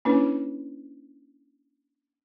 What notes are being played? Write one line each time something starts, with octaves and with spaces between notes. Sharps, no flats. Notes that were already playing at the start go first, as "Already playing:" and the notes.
A#3 C#4 D4 E4 B4 C#5